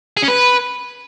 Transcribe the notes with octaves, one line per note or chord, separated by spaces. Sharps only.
G#4
C#4
B4